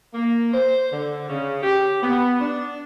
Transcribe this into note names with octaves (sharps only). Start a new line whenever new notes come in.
A#3
C5
D3
C#3
G4
B3
D4